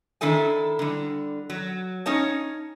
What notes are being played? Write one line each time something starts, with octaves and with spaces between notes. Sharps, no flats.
D#3 D4 E4 A4 G#5
D3 G3
F#3
C#4 D#4 C#5 A5